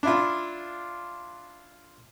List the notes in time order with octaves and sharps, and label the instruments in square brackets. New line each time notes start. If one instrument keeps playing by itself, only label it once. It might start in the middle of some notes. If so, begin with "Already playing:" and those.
[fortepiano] D4 E4 F4